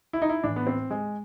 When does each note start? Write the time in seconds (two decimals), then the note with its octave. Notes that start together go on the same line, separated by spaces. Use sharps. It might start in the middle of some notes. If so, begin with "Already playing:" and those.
0.13 E4
0.22 D#4
0.29 E4
0.43 A2 E3 D4
0.56 B3
0.67 C4
0.90 G#3